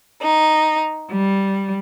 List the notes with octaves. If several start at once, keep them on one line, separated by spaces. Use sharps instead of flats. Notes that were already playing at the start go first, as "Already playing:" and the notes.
D#4
G3